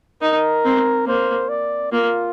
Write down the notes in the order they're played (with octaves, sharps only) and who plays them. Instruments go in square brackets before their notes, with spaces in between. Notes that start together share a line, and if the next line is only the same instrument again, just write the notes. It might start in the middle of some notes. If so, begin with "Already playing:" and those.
[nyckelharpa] D#4 [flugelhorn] A#4
[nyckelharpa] C4
[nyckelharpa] A#3 [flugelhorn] C5
[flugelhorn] D5
[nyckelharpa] A#3 [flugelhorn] F4